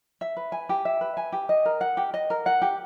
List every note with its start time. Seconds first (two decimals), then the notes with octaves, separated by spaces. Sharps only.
0.21 E5
0.37 B4
0.52 G#5
0.69 G4
0.85 E5
1.01 B4
1.17 G#5
1.33 G4
1.49 D#5
1.65 A#4
1.81 F#5
1.97 G4
2.14 D#5
2.30 A#4
2.46 F#5
2.62 G4